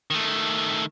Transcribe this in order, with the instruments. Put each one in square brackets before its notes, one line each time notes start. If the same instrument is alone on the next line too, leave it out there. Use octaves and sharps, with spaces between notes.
[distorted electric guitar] D#3 A3